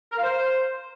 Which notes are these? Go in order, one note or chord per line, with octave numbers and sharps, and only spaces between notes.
A#4
F5
C5